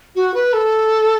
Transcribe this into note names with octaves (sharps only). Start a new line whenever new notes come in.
F#4
B4
A4